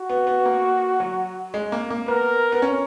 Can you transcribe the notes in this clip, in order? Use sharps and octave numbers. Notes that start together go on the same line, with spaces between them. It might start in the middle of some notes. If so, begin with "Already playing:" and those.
Already playing: F#4
B3
B3
A#3
F#3
G#3
A#3
A#3
B3 A#4
B3
C#4